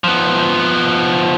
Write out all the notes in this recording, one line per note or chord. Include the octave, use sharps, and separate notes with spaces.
F3 B3